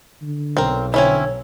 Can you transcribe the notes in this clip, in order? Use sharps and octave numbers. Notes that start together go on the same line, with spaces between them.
D3
B1 C4 A#4
D3 C4 C#4 E4 C#5